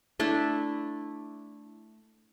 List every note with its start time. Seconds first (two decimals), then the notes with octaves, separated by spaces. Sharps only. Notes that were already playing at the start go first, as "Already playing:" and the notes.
0.20 A3 D4 E4 D5